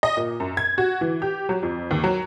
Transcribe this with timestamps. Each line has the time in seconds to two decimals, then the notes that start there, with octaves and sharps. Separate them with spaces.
0.03 D#5
0.17 A#2
0.40 F#2
0.57 G#6
0.78 F#4
1.01 E3
1.22 G4
1.49 F#3
1.63 F2
1.91 D#2
2.04 F#3